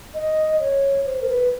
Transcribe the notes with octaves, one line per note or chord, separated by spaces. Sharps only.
D#5
C#5
C5
A#4
B4